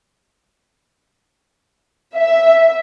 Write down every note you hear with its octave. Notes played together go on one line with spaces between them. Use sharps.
E5